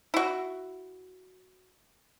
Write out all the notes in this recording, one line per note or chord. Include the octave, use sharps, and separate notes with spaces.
E4 F#4